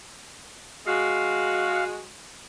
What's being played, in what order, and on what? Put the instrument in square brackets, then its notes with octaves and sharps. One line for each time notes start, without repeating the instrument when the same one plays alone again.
[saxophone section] G#3 F#4 [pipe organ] F5